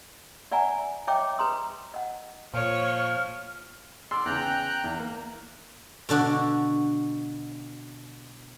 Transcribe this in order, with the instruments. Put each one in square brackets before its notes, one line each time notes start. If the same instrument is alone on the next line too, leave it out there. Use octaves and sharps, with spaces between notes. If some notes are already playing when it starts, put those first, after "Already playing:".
[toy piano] D5 E5 F#5 G#5 A#5
C#5 D#5 E5 G5 A#5 D6
B4 A#5 C6 D#6
D#5 F#5
[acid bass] A#2 [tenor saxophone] F3 [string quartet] C#5 [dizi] F6
[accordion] D5 [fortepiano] C6 E6
[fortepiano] E2 C#3 [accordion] G5 A#5 F#6
[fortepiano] E2 [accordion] E3
[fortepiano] A#3
[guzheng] B2 D3 D4 F#4